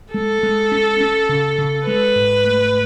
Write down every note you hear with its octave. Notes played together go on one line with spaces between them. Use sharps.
G#3 A4
G#3
C#4
C#4
C#3
C#3
G#3 B4
G#2
A3